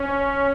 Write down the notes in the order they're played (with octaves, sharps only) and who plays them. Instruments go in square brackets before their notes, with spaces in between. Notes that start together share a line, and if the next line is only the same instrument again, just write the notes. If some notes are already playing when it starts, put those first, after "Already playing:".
Already playing: [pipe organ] C#4